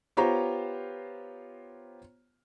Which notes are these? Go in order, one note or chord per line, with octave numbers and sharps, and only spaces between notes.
B3 F4 G4 C5 C#5 A#5